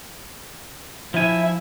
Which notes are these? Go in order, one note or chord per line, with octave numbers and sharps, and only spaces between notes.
F3 E4 G#5